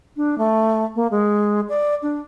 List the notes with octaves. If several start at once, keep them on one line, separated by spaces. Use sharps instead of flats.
D4
A3
A#3
G#3
D5
D4